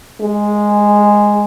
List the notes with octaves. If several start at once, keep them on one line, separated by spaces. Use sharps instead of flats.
G#3